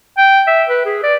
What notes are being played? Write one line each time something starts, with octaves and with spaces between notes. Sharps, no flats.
G5
E5
B4
G#4
D5